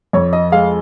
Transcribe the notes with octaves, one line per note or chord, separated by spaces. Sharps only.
F2 C#5
D#5
G#3 F5